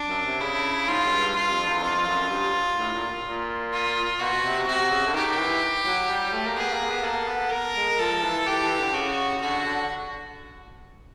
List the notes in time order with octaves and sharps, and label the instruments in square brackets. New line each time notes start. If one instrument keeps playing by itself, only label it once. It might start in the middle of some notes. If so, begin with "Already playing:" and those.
Already playing: [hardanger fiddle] D4
[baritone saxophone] F#2
C3
[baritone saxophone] C#3 [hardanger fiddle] E4
[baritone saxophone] G#2 [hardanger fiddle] F4
[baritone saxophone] F#2
G2
[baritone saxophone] G2 [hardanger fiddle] F4
[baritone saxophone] F2
E2
[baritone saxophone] F2 [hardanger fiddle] F4
[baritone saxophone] F#2
G2
A2
A#2
A#2
[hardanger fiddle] F4
[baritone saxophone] B2 [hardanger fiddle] F#4
[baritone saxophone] B2
C3
[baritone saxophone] C3 [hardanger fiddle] F#4
[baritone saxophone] C#3
D3
[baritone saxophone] D#3 [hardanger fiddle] G4
[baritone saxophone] E3
F#3
G3
A3
A#3
[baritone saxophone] B3 [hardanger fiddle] G#4
[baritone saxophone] A#3
B3
[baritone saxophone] A#3 [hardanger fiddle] A4
[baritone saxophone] B3
[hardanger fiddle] A#4
[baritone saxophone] G#3
[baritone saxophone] F3 [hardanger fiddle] A4
[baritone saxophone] E3
[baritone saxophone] E3 [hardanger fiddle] G4
[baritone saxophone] E3
D3
[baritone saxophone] C#3 [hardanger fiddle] F#4
[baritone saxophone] D3 [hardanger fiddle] F#4
[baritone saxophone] D3